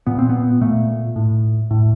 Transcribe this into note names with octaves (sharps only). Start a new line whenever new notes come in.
A#2 B3
C4
B3
A#2 A3
A2
A2